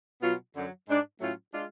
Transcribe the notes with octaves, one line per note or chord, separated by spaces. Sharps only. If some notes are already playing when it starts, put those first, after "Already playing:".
B2 F#3 B3 F4
F#2 D3 F#3
G#2 G#3 D4
A2 F#3 A3 C#4 F4
G#3 D4 F4